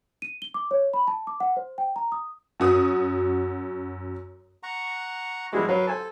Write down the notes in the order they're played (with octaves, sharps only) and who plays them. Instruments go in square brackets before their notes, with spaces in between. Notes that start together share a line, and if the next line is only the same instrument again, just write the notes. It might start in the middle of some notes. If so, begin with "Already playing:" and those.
[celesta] D#7
G7
D6
C#5
B5
A5
D6
F#5
C5
G5
A#5
D#6
[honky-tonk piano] F#2 F#4 D#6
[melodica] F#5 A#5 C#6
[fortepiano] F3 G3 G#3 [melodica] E4 F#4 G#4
[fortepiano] F#3 [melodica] A#4 B4 F5
[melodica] A4 [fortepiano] C5 G#5 A5